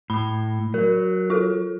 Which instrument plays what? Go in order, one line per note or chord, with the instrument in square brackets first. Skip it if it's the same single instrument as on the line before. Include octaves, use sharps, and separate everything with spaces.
[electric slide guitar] A2 [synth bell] B5
[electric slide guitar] F#3 [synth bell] A#4
[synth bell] F4 A4